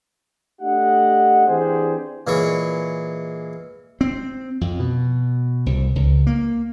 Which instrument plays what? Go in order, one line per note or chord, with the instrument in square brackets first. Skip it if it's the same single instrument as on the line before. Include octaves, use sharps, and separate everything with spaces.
[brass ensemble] A3 D4 G4 D#5 F#5
E3 C4 D4 G4 G#4 C5
[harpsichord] A#2 E3 G#3 E4 C#5 C#6
[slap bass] C4
F2
B2
C2
C#2
A#3